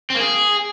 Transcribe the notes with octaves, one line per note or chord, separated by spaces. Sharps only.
C4
A#3
G#4